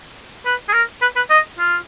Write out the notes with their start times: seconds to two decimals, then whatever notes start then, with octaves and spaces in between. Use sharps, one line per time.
0.45 B4
0.69 G#4
0.73 A#4
1.02 B4
1.16 B4
1.30 D#5
1.59 F4